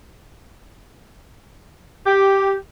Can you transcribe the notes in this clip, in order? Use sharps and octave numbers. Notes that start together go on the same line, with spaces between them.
G4